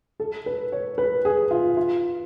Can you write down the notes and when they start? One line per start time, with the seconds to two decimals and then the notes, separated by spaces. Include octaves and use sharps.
0.20 A4
0.46 B4
0.72 C#5
0.98 B4
1.25 G#4
1.51 F4
1.77 F4